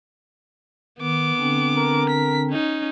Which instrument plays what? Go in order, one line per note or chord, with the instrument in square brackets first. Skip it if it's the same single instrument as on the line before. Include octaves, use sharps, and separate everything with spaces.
[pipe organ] D#3 [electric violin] B3 D6
[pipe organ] D3 C4 D4
[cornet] A#4
[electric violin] B6
C#4 D#4